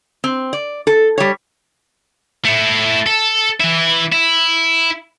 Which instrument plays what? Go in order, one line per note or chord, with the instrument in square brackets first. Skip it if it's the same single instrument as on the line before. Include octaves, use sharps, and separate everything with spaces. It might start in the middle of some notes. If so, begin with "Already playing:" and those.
[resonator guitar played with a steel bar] C4
D5
A4
G3 C#5
[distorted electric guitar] A3 E4
A4
E3 E4
E4